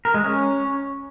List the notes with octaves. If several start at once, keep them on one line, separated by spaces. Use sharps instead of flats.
A#4
G#3
C#4